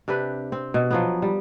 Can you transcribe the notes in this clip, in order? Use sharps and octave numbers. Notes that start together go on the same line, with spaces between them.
C3 D4 G4 B4
C4
B2
F3 F#3 B3
G3